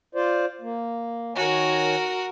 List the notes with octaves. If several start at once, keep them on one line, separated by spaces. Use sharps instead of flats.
F4 C5 D5
A#3
D#3 F#4 A#4 C#5 G#5